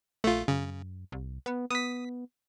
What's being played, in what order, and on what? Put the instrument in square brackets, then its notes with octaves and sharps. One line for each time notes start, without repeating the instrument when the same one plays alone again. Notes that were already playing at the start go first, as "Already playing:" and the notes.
[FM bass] A#1 [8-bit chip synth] A3 F4
[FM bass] F#2 [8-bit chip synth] C#3
[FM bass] C2
B3
[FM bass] B3 [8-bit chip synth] D#6 B6